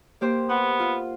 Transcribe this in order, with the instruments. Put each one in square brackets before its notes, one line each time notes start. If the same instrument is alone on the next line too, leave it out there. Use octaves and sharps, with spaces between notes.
[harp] A#3 G4 C5
[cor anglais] B3 [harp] F#5
[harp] F4